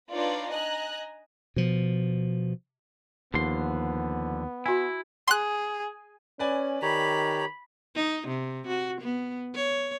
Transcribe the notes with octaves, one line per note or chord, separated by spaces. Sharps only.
D4 D#4 F4 B4 C#5 D5
D#5 G#5 A#5 F#6
B2 F3
D#2 D3 F3 B3 C6
E4 F#4 G#5
G#4 C6 F#6
C#4 B4 D5 G#5
D#3 G4 C#5 A#5 B5
D#4
C3
F#4
B3
C#5